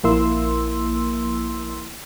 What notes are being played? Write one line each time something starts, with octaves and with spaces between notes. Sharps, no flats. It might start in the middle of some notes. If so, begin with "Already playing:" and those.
A#1 F3 A#3 E4 C6 E6